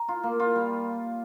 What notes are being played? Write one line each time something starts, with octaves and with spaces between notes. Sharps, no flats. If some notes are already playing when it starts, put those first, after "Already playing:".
Already playing: A#5
F4
A#3
F4
G3